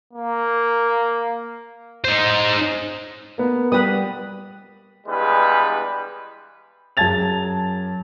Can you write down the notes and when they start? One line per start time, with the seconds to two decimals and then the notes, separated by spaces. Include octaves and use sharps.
0.13 A#3
2.04 D#4 C5
3.38 A#3 B3
3.72 G3 G4 B4 D#6
5.07 E2 G2 G3 G#3 B4
6.97 F#2 G#4 A5 G#6 A6 F7